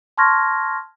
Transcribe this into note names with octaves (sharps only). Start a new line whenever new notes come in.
A5 C6 C#6 F6 G#6 A#6